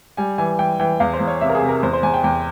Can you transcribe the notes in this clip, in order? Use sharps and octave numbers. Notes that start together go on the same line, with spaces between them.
G3 G#5
E3 G#5
E3 G5
E3 G5
E2 F5
C5
E2
C#5
C3 E5
A#4
G#4
C3
A#4
E2 C5
C5
E2 G#5
G5
E2 G5